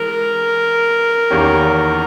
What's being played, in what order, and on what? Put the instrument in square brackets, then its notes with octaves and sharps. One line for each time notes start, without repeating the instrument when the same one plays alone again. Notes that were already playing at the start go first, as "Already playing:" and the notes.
Already playing: [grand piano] E3 G#3 [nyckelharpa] A#4
[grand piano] E2 D#3 A#3 C#4 G4